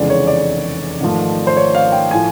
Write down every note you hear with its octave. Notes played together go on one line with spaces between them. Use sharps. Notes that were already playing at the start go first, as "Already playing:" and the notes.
Already playing: F1 E2 C#3 E3 G#3 D5
C#5
D5
G#1 G#2 F3 A3
C5
C#5
F5
G5
A2 F3 G#5